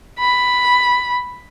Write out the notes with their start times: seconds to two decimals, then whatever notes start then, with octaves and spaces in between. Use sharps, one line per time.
0.20 B5